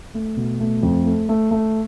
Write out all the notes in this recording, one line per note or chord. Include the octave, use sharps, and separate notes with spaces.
A3
B2
A3
F2
A3
A3
A3